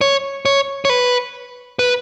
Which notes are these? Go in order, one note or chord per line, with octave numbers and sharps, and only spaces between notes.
C#5
C#5
C#5
B4
B4